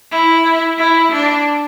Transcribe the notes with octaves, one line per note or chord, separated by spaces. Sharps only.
E4
E4
D4